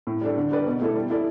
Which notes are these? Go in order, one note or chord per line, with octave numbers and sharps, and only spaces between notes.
A2
G3 D4 A4 D5
D3
G3 D4 B4 D5
B2
A3 E4 A4
G3
E4 A4 D5